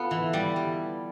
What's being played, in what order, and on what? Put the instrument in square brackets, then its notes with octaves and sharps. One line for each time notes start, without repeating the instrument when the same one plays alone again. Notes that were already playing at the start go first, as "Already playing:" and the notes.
Already playing: [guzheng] B3 [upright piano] F4 A4
[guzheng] E3
G3
G3